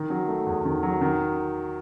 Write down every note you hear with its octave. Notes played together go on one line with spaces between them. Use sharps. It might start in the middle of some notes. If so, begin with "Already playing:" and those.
Already playing: D#3
F#3
A3
E2
D#3
F#3
D#3